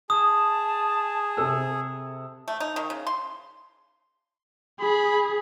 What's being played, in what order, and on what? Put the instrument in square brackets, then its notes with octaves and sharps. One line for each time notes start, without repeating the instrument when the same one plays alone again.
[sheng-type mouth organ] G#4 [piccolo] A5 [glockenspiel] D#6
[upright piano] C3 A4 E6
[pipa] A3
D#4
D#3
C#3
C6
[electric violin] G#4 [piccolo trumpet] B5